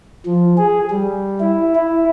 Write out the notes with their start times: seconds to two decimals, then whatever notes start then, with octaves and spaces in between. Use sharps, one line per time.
0.26 F3
0.57 G#4
0.90 G3
1.40 E4
1.75 E4